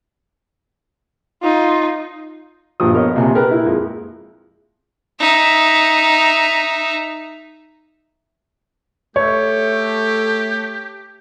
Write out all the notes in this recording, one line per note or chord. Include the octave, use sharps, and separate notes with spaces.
D#4 F4
A#1 G2 A#2 F3 D#6
F3 B3 A#4 C#5 D#5
A#1 C3 G#5
G4 A#4 B4
A#2 E4
F2 G#3
D#4 E5
A3 G4 C#5